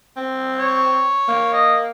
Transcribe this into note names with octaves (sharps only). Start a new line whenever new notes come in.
C4
C#5
A#3
D#5